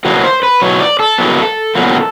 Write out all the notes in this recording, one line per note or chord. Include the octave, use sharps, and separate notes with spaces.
E2 B2 F#3 A#3
C5
B4
E2 B2 F#3 C#5
D5
A4
E2 B2 F#3 A#3
E2 B2 F#3 A#3